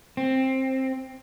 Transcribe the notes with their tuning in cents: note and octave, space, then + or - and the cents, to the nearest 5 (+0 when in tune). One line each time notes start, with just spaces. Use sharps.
C4 +10